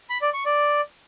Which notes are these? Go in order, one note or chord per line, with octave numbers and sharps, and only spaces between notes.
B5
D5
C#6
D5